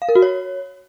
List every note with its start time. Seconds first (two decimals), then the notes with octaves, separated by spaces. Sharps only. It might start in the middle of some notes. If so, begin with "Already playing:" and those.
0.02 F5
0.09 A#4
0.15 F#4
0.22 C#5